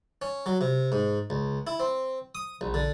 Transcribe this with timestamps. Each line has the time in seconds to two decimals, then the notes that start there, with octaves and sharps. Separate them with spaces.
0.22 C#4
0.46 F#3
0.61 C3
0.92 G#2
1.30 C#2
1.67 E4
1.80 C4
2.35 D#6
2.61 A#1
2.74 D3